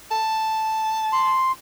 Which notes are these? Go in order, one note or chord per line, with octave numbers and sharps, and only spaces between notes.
A5
C6